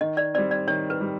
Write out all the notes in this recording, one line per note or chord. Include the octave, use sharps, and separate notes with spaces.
D#3 D#5
D5
G3 C4 D5
D5
D#3 C#5
B4
G3